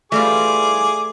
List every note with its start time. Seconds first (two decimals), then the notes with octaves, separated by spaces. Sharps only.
0.12 E3 G3 A3 F4 G#4 D6